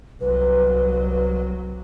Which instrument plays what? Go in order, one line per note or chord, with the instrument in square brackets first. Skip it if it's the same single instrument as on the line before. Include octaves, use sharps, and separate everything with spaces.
[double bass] C2 F#3 [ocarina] B4